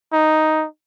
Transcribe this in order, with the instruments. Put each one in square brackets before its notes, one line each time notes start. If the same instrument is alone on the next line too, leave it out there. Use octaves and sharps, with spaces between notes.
[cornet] D#4